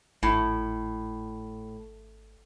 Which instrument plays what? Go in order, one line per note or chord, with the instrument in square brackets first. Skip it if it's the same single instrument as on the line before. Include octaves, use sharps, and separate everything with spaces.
[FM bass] G#1 [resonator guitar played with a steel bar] A2